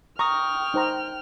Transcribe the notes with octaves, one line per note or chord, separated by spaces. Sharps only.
G5 A#5 C#6 D#6 F6
D#4 C5 A#5